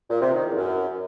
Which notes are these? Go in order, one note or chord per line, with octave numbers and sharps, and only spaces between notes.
A#2
C3
D#3
E2
F#2